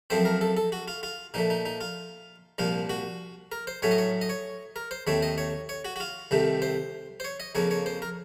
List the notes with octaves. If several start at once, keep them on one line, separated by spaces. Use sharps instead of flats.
F#2 F3 A3 C4 C5
A#4
A4
A4
F#4
F4
F4
A#2 F3 A3 D#4
D#4
D#4
F4
C2 A#2 F3 F4
F#4
A#4
C5
A2 F#3 A3 C#4 C#5
D#5
C#5
D#5
C#5
A#4
C5
D#2 D#3 A3 C4 C#5
D#5
C#5
C#5
F#4
F#4
F4
C2 C3 D#3 A3
C5
C5
C#5
D#5
F2 C#3 F3 A#3 C#5
C#5
C5
A#4